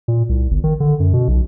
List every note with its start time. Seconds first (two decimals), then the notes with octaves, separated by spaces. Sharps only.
0.08 A#2
0.29 C2
0.51 G1
0.64 D#3
0.80 D3
1.00 F#2
1.13 B2
1.28 B1